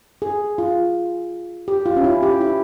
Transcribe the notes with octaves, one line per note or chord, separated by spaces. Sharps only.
G#4
F4
G4
F4
C#4
E4
G4
E4